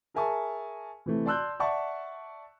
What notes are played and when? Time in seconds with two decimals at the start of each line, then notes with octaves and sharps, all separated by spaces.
0.14 G#4 A#4 E5 G#5 A5 C#6
1.06 C3 E3 A3
1.26 D5 A5 C6 E6 F#6 G6
1.60 D5 E5 F#5 A5 C#6